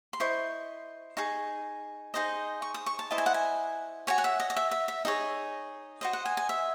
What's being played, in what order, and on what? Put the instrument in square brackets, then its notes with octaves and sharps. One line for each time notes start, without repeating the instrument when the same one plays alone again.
[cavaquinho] C6
E4 C5 D#5 C#6
D#4 G#4 C#6
D#4 G#4 C5 D#5
C#6
D#6
C#6
A5
E4 C5 D#5 A5
G#5
F#5
G#5
F#4 C#5 G#5
F#5
E5
D#5
D#5
E5
E5
E5
D#4 G#4 C#5 D#5
F#4 C5 D#5
F#5
G#5
G#5
E5